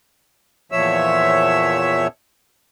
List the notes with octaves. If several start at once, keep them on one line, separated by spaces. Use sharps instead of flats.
E2 A#2 F3 C#5 E5 E6